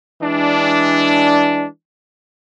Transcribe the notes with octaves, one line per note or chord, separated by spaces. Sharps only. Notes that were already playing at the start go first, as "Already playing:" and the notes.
E3 G#3 D4